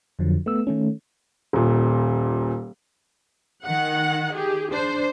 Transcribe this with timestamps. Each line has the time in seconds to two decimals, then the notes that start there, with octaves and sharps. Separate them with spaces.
0.19 F2 D3 F3 F#3
0.46 A3 B3 E6
0.67 D#3 A3 C#4
1.53 D#1 A#2
3.65 D#3 F#5
4.35 G4 G#4
4.72 D4 C5